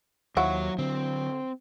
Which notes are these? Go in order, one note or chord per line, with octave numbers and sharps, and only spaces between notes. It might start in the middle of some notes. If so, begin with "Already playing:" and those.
D#2 F3 F#3 E4 F#4 C#5
D3 F#3 C4